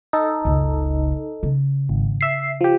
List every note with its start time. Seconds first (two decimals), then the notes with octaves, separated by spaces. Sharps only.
0.13 D#4 A4
0.45 F#1 C#2
1.43 C#3
1.89 G#1
2.21 E5 C7
2.61 F3 G4